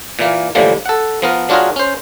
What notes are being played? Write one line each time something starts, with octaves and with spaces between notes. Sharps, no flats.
A#2 E3 A#3
A2 D3 E3 F3 G3 A#3
A4 F#5
F3 B3 A#4
F#3 D4 F4 F#4 G#4 A#4
C#4 C5